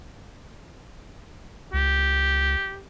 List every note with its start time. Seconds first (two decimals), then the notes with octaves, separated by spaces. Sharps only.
1.73 C#2 G4